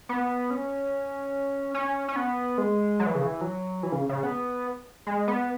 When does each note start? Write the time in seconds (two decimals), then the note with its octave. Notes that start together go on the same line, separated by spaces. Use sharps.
0.09 B3
0.50 C#4
1.74 C#4
2.08 C#4
2.16 B3
2.58 G#3
3.00 F#3
3.07 E3
3.15 C#3
3.23 E3
3.41 F#3
3.83 E3
3.92 C#3
4.09 C#3
4.23 B3
5.07 G#3
5.28 B3